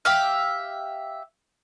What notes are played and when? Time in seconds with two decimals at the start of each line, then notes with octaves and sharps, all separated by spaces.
0.05 G4 E5 F5